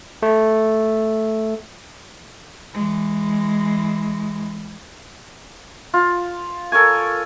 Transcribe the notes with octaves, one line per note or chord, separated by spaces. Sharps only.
A3
E3 G#3
F4
A4 A#4 C#5 G#5